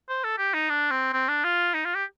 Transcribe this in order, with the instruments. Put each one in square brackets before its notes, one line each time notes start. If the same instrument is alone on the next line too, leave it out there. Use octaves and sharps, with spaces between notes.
[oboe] C5
A4
G4
D#4
D4
C4
C4
D4
F4
D#4
F4
G4